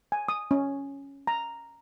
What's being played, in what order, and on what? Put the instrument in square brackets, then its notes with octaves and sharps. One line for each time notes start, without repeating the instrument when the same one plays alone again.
[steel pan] G#5
D#6
C#4
A#5